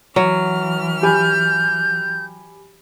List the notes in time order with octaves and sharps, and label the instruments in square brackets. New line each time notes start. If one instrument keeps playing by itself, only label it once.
[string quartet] E3 F6 [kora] F#3
[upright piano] G4 G#5 B5 [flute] G6